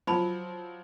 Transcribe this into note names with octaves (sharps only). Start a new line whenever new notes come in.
F3 F#3 C5 A5 B5